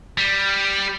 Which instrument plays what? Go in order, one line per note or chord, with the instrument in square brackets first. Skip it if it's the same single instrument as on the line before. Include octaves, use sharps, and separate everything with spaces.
[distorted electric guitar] G3